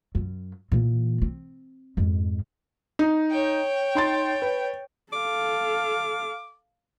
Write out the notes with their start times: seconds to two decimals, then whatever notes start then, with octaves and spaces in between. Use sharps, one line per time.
0.15 F#2
0.72 A#2 E3
1.22 C4
1.97 F2 G#2
2.99 D#4
3.31 C#5 G5
3.95 D#4 C6 A6
4.42 B4
5.13 A4 F5 D6